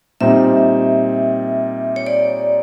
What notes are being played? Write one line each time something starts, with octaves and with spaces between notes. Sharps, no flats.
A#2 G3 C4 D#4 E5
C#5
D5